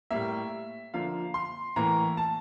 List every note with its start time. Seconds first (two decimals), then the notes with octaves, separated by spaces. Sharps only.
0.11 A2 G3 A#3 E5
0.94 D3 F3 A#3 F5
1.34 C6
1.76 A2 E3 A#3 A#5
2.17 A5